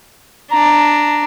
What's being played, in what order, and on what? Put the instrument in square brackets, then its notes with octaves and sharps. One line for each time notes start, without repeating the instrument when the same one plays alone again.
[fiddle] D4 [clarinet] A#5